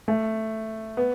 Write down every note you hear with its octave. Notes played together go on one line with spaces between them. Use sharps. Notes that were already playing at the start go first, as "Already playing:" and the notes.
A3
B3